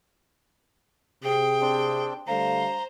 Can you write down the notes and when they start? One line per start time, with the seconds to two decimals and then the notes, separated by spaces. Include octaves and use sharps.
1.23 C3 G#4 G5
1.61 C4 D4
2.27 D3 G3 A3 C5 F5 A#5